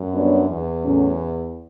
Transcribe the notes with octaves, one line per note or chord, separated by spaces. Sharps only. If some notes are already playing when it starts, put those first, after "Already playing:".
Already playing: F#2
G3 B3 D4 F#4 C#5
E2
A2 F#3 C#4